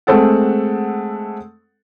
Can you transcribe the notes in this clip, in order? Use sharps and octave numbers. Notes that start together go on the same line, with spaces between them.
G#3 A3 C4 A4 F#5